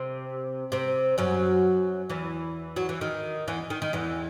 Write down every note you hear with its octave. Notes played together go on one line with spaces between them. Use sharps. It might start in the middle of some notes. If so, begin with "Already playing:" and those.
Already playing: C3 C4
C3 C4
F#2 F#3
E2 E3
F#3
E3
D#3
E2 E3
D#3
D#3
E2 E3